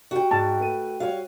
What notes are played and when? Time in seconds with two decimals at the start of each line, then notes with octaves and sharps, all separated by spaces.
0.11 F#4 G4 F5 G5
0.31 G#2 A5
0.59 A3 B4 D#7
1.00 G3 F#4 C#5 F5